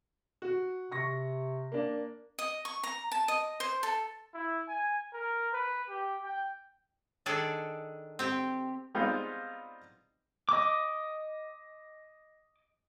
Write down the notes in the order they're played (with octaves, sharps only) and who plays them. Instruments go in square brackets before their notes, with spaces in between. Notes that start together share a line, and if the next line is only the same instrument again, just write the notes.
[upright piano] F#4
[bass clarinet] C3 [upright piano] C#6 A#6
[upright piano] A#3 D4
[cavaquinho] D#5
C#6
A#5
A5
D#5
C5
A4
[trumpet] E4
G#5
A#4
B4
G4
G5
[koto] D#3 D4 G#4 A4 D5
C4 G4
[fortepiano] G3 G#3 B3 C4 D#4 F4
[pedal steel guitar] D#5 D6